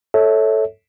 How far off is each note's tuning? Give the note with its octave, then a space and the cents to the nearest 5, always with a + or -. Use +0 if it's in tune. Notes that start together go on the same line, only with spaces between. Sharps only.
A4 +0 C#5 +0 E5 -25